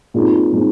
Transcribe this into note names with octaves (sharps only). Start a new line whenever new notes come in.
A#2 G#3 C4 D#4
A#2 G#3 C4 D#4